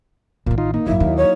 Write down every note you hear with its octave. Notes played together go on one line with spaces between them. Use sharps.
A1 A#2 D#3
D#4 F4
A#3 D#4
A1 F#2 F#3 E4 E5
D#2 D#4 E4
C#5